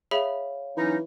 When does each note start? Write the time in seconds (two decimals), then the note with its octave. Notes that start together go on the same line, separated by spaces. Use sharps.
0.11 G#4 C#5 E5 F5 B5
0.77 E3 F#3 C#4 D#4